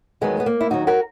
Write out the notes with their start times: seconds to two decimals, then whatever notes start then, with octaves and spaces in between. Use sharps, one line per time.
0.21 E2 D#3 F#3 G#3 B3
0.40 B3
0.46 A#3
0.61 E4
0.70 D#2 D#3 F#3 D#4 F#4
0.87 F#4 A#4